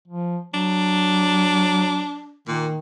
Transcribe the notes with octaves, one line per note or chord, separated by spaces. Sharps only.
F3
F#3 D4
A#2 D#3